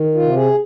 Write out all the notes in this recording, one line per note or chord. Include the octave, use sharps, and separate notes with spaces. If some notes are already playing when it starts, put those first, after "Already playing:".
Already playing: D#3
F4
C3
G#4